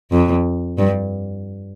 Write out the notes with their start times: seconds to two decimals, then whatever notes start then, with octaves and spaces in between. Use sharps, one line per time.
0.11 F2
0.78 G2